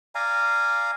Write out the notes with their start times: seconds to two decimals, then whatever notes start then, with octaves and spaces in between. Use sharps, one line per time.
0.15 D5 F5 G#5 A#5